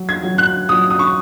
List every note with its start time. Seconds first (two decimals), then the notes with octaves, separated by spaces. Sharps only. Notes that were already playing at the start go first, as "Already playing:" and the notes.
Already playing: F#3
0.09 G#6
0.23 F#3
0.38 F#6
0.69 F#3 D#6
0.90 D#6
0.99 C#6